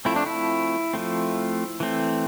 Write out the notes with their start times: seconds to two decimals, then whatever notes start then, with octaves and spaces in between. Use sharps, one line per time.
0.05 F3 A3 C4 E4
0.16 D4
0.26 E4
0.94 F3 A3 C4
1.80 E3 A3 C4